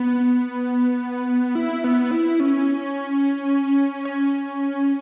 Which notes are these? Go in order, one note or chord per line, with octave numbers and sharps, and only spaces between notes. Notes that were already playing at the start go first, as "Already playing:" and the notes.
Already playing: B3
E4
B3
E4
C#4
C#4